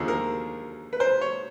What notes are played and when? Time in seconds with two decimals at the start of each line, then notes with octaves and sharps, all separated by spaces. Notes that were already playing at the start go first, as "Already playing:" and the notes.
Already playing: D#2 D3 F3 G#4
0.08 A#4
0.93 B4
1.00 C5
1.21 C#5